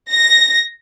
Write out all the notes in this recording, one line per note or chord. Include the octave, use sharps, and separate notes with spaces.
A#6